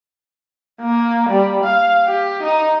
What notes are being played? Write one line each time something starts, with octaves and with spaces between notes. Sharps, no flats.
A#3
G3
F5
G4
D#4